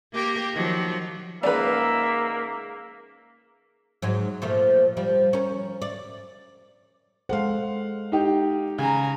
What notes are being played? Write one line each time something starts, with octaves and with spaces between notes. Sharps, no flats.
A#3 G4 A#4
D#3 F3 F#3
C#2 G#2 F3 A#3 B4 D5 E5
G#2 F#3 G#3
A#2 F3 A3
F3 G3
C#4 A#4
D5
G#3 A4 C5 F5 F#5
D#4 G4
C#3 G#5 A#5